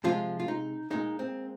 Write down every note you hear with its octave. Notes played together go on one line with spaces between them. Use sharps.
C3 F3 G#3 F4
F4
D#4
A#2 G#3 D#4
C4